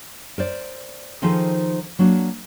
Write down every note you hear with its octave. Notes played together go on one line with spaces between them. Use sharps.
A#4 C5 D5
D#3 F3 D#4 G#4 A4 C5
F#3 A#3 D4 F#4